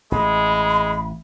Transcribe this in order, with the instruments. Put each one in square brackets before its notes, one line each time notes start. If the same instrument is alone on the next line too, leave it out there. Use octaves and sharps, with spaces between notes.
[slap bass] A1 [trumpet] G#3 [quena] B5